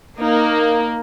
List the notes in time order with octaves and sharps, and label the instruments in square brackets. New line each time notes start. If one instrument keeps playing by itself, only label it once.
[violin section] A#3 [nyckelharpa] D#4